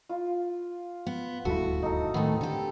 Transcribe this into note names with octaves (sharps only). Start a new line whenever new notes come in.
F4
B3
D#1 D2 G2 E4 F#4 A4
D#4 A4
A2 D#3 A3 B3 C4
D3 G4 A4